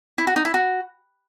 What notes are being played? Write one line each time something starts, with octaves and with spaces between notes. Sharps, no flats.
E4
F#4
D#4
E4
F#4